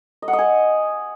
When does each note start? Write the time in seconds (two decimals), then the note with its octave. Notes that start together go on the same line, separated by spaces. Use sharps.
0.22 D#5
0.28 F#5
0.33 D#5
0.39 G#5